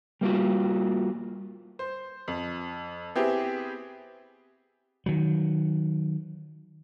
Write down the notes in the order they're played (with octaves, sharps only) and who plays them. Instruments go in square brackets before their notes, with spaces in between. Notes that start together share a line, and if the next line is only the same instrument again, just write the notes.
[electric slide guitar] G3 A#3 F4 F#4
[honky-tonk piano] C5
F2
B3 C4 E4 G4 G#4
[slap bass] D#3 F#3